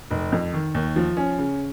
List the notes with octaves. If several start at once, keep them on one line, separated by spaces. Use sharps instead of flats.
F1
F2
D#3
D#2
F3
C#4
C#3